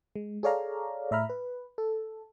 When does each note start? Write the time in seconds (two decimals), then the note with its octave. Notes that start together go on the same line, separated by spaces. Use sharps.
0.16 G#3
0.43 G#4 A4 C#5 D5 F5 A#5
1.11 A2 E5 A#5 B5 F6
1.29 B4
1.78 A4